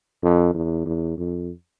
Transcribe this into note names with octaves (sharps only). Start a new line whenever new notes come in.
F2
E2
E2
F2